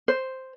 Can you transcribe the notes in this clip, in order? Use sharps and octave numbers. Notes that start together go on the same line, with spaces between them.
C5